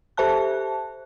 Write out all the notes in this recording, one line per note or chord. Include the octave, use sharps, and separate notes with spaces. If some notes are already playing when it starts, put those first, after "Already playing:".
G4 A4 C5 E5 A5 F#6